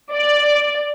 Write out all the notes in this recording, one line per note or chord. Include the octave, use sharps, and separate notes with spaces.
D5